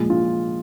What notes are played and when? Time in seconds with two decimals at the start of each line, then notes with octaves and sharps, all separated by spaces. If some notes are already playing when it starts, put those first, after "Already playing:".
Already playing: A#2 F3 G#3
0.10 F4